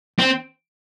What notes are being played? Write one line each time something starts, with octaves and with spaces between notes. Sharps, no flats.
C4